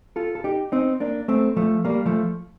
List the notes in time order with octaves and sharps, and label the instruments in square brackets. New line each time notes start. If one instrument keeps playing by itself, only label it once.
[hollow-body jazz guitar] F4 A4
A4
D#4 G4
C4 D#4
A#3 D4
A3 C4
F3 A3
G3 A#3
F3 A3